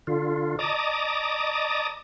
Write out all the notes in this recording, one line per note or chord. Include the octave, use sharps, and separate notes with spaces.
D3 F4
D5 D#5 A5 A#5 D6 D#6